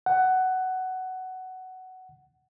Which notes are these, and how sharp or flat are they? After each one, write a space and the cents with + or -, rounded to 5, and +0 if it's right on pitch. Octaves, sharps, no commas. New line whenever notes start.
F#5 +15